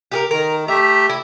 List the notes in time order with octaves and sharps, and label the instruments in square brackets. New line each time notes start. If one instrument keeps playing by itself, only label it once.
[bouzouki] G4 G#4 A#4
[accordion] D#3 [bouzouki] A#4
[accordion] A3 G4 E5 [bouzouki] A#5
[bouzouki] E4